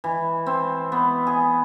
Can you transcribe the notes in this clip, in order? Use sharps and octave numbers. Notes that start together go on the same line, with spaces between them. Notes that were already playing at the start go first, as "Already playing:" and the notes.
E3
C4
B3
G#4